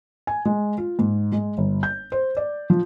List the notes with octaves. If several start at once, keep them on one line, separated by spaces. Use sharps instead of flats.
G#5
G#3
F4
G#2
G#3
G1
G6
C5
D5
F3